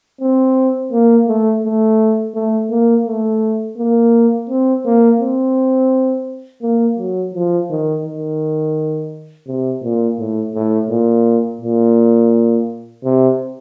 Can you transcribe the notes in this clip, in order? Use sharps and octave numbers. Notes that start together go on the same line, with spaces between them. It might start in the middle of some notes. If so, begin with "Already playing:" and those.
C4
A#3
A3
A3
A3
A#3
A3
A#3
C4
A#3
C4
A#3
F#3
F3
D#3
D#3
C3
A#2
A2
A2
A#2
A#2
C3